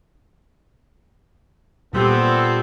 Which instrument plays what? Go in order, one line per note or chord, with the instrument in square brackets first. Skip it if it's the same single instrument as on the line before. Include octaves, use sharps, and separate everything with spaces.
[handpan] A#2 G3 G4 [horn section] B3 C4 A4